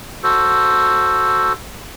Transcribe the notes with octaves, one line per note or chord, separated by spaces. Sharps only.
F#4 A4 C5